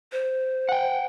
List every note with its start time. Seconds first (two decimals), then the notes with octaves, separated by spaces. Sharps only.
0.12 C5
0.69 F#5 G5